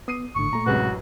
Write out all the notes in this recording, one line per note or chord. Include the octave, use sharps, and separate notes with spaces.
B3 D#6 C7 D#7
G#1 A2 D3 C#6
A#2 A3 A#5
A1 F#2 A2 C3 G#3 F#4 B4